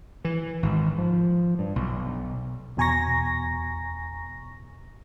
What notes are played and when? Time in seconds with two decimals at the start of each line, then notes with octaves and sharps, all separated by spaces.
0.25 E3
0.63 G#1
0.98 F3
1.59 G2
1.76 B1
2.77 E2 B2 G#5 A#5 C#6 A#6